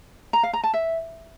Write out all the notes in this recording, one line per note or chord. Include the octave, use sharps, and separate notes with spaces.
A#5
F5
A#5
A5
E5